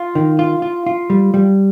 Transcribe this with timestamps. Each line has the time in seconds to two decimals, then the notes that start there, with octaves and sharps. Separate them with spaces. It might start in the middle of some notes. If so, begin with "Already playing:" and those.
Already playing: F4
0.15 D#3
0.39 F4
0.62 F4
0.87 F4
1.10 G3
1.34 G3